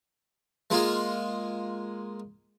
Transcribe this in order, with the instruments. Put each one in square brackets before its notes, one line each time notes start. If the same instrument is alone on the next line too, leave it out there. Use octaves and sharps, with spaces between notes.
[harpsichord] G#3 A#3 F4 G#4